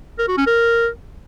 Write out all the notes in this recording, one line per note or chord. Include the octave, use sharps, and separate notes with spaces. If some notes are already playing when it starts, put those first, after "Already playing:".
A#4
F#4
C#4
A#4